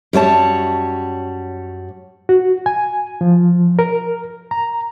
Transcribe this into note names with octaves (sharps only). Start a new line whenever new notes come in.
F#2 G3 C#5 A5
F#4
G#5
F3
A#4
A#5